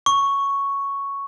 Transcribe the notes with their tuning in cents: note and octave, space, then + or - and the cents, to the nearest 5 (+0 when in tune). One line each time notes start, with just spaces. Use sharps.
C#6 +0